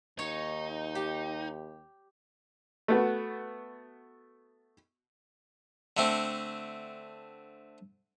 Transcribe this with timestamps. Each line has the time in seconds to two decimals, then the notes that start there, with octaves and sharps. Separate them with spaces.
0.19 D#2 D#4 C#5
0.95 G4
2.88 A3 B3 F#4
5.97 D3 A3 C4